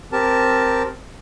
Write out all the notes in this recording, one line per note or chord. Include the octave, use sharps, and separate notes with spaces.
C4 G4 A#4 A5